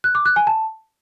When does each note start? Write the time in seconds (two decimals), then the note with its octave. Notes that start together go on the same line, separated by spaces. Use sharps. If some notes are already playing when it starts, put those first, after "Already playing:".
0.04 F#6
0.15 D6
0.26 F#6
0.36 G#5
0.47 A5